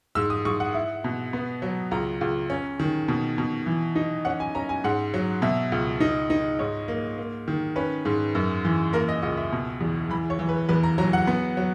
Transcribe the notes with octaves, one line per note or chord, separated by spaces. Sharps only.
G#2 E6
D#6
G#2 C#6
F#5
E4
B2
B3
F#3
C#2 A#5
C#2
C#4
D#3
B2
B2
E3
D#4
C#4 F#5
G#5
C#4 A#5
G#5
G#2 F#5
F#3
B2 E5
C#2
D#4
D#4
G#2 C#5
A#3
A#3
D#3
C#4 B4
G#2
F#2
E3
A#3 A#4
D#5
C#2 D#5
E5
B2
E2
E3 B5
C#5
E3
B4
E2 B4
A#5
F#3 A#5
F#5
B3
F#3